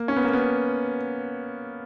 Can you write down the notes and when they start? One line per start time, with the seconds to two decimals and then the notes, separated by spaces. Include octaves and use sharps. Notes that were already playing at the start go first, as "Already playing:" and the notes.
Already playing: A#3
0.08 C#4
0.16 B3
0.24 A#3
0.33 B3